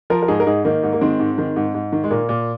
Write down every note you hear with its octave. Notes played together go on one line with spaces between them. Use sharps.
F3 F4 A#4
A#4
G#2 D#4 G#4
A#4
G#2 D#4 G#4
D#3 A#3 D#4
G#2
A#3
D#3 G#3 C4
G#2
D#3
G#2
G#2
D#3
G#3
A#2 A#3
A#2